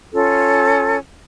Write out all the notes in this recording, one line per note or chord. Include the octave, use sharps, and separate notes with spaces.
C#4 F4 A4